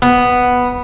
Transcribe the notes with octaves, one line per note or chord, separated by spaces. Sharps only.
B3